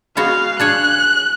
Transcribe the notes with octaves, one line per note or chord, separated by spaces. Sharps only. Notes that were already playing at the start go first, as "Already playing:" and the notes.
G#3 B3 F#4 F5
D4 G#4 C#5 F#6